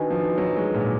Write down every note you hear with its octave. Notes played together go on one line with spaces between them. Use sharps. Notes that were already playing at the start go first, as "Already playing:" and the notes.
Already playing: D#3 D4 F#4 B4 D#5 G#5
F3
F#3
G#3
A#2